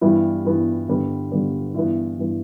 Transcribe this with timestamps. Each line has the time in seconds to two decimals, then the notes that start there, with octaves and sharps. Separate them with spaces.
0.01 G2 E3 G3 B3 E4
0.45 G2 E3 G3 B3
0.88 G2 D3 G3 B3
1.32 G2 D3 G3 B3
1.75 G2 E3 B3 E4
2.18 G2 E3 B3